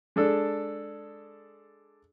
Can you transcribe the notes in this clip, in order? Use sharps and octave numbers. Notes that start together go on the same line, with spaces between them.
G#3 D4 A4